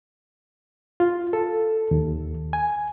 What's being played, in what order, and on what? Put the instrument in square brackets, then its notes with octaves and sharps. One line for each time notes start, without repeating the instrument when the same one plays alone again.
[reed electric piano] F4
A4
D#2
G#5